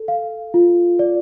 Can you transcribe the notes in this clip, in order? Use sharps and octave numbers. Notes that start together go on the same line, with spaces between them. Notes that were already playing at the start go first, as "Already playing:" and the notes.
Already playing: A4
F5
F4
D5